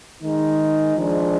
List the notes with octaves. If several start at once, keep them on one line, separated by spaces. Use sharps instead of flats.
D#3 G#3 D#4
F3 G#3 D4